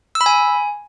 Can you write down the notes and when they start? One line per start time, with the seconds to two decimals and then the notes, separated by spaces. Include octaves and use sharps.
0.15 E6
0.21 B5
0.26 G#5